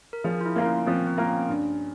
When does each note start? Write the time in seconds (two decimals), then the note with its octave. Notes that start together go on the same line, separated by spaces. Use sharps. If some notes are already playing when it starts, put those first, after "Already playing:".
0.13 A#4
0.24 F3 G#4
0.41 F4
0.46 E4
0.56 A#3 F4 A#4
0.66 C#4
0.87 F3 C4
1.07 C4
1.18 A#3 F4 A#4
1.28 C#4
1.49 G2